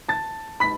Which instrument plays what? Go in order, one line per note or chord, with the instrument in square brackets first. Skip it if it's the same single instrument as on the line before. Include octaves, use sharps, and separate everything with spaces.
[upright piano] A5 A6
B5 B6